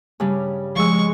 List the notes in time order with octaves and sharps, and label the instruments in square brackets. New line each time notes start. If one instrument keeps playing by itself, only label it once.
[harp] G2 C#3 G3
[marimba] F3 E6 [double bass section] G#3 [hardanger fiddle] C#6